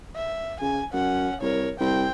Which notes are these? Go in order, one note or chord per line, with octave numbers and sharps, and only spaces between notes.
E5
C#3 G#5
F#2 C#4 F#5
C2 A#4 C#5
C2 C4 G5